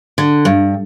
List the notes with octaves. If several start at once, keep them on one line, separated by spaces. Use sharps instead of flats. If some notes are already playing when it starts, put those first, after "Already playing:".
D3
G2